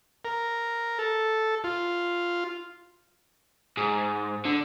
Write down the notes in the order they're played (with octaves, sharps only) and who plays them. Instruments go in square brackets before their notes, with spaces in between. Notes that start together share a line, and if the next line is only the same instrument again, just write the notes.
[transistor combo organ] A#4
A4
F4
[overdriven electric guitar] G#2
D3